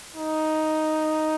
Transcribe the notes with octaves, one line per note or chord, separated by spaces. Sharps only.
D#4